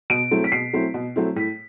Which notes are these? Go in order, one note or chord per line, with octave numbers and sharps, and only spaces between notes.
B2 D7
F#3 A3 C4 E4
B6
B2 C7
F#3 A3 C4 E4
B2
F#3 A3 C4 E4
A2 B6